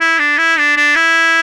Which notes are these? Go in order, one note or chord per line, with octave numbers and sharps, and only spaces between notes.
E4
D4
E4
D4
D4
E4